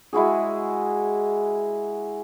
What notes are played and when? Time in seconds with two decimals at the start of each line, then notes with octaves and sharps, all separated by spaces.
0.13 G#3 E4 F#4 G#4